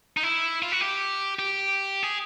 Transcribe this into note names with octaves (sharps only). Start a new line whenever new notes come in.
D#4
E4
F4
F#4
G4
G4
G#4